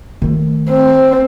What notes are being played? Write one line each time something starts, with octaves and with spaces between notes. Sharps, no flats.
D#3 A3
C4